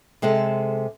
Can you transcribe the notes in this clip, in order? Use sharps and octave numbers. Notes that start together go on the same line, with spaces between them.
C3 G#3 C4 A4